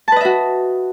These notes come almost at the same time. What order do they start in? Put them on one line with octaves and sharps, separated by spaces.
A5 B4 D#5 E5 F#4